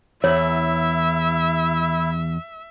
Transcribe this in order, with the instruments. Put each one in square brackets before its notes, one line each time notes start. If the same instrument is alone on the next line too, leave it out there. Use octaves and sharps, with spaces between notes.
[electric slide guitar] E2 [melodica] E4 [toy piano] C#5 [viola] E5